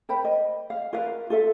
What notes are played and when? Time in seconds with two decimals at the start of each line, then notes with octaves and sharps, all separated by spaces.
0.09 A#4 C5 G5 B5
0.25 D#5
0.70 F5
0.93 F4 A#4 B4 F5
1.30 F4 A4 E5